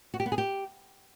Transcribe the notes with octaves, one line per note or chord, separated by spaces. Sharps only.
F#4
G4
B3
G#4
G4